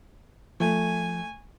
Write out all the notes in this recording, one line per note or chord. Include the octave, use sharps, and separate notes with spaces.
F3 A3 G#5